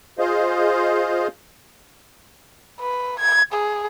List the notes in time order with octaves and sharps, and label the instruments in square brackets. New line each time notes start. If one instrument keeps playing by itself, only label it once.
[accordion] F4 G#4 C5 D#5 F5
[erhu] B4
G#6
G#4